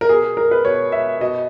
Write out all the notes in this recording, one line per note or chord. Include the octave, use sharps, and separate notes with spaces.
A#4
B2 G#4
A#4
B4
B2 C#5
E5
B2 D#5